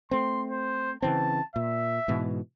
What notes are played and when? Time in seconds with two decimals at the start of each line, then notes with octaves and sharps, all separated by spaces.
0.11 A3 C4 C6
0.51 C5
1.02 C#3 E3 C4 A5
1.56 A#2 E5
2.08 G#2 B2 E3